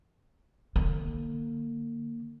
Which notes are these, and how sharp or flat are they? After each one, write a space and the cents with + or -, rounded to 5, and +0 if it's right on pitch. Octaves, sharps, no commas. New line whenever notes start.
D3 +45 A#3 +0